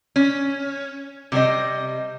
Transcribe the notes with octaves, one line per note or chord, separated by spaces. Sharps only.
C#4
C3 G3 E4 C5 D#5